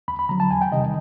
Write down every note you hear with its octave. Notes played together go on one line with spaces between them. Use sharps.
D#2 B5
B5
D3 F#3 A#5
A5
E2 G#5
G5
C3 D#3 G3 D#5